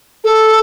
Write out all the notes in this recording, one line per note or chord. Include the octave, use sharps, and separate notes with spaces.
A4